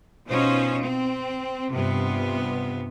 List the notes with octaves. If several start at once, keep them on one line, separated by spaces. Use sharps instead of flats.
B2 C#4 D#4 F4 C5
C4
G2 C3 B3 F4